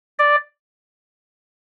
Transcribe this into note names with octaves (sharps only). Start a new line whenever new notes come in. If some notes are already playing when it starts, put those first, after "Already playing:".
D5